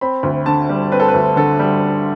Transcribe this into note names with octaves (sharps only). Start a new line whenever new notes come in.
C4 B5
D2
D3 A5
G3
C4 B4
A4
B4
D2
D3 A4
G3